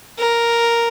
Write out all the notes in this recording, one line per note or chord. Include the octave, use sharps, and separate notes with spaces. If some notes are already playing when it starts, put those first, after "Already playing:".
A#4